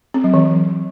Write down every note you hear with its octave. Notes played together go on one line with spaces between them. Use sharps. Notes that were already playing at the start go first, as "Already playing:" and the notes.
C4
F#3
E3